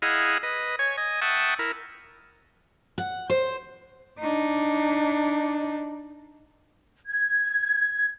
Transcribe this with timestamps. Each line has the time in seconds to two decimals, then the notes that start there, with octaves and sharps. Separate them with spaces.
0.02 E4 G#4 D#5 F5 F#5
0.43 B4 D#5
0.79 C#5 G#5
0.98 D#5 G#5
1.22 E5 F#5 G5 A5 C#6 D#6
1.59 E4 A#4
2.98 F#5
3.30 C5
4.18 D4 D#4
7.06 G#6